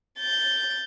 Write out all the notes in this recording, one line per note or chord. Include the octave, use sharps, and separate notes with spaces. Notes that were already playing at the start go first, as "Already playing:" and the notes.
G6 A6